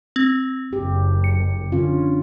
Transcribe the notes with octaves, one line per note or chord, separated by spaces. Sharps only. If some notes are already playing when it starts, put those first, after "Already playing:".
C4
F#1 G4
C#7
D3 C#4 F4